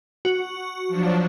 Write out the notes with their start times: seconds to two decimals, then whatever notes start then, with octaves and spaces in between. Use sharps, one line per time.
0.25 F#4
0.88 F3 F#3 D4